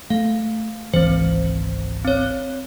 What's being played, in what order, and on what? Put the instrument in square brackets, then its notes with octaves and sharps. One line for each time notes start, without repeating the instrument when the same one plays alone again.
[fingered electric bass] A3 [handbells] F5
[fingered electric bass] G#1 C#2 E3 [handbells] C4 C5
[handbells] C4 C#5